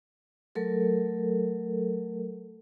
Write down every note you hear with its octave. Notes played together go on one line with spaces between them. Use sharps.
F#3 A3 A4 A#4